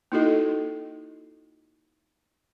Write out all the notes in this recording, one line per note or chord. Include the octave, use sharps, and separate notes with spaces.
A#3 D#4 E4 F#4 A4 D#5